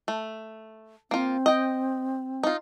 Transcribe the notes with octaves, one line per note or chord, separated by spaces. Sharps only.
A3
A#3 C4 F4
D#5 G5
D#4 F4